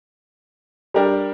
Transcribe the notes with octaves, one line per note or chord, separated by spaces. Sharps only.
G3 D4 G4 A#4